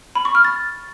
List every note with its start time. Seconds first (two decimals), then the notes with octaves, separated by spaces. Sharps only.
0.15 B5
0.25 C#6
0.35 F6
0.45 A6